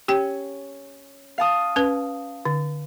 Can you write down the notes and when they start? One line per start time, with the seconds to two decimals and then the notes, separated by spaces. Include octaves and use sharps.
0.08 C#4 G4 G5
1.38 F5 A5 D#6
1.76 C#4 B4
2.45 D3